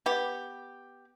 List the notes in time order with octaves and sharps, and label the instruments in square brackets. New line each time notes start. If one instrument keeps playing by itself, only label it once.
[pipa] B3 G4